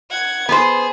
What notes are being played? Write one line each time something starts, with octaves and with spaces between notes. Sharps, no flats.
F#5 G#6
B3 G#4 C5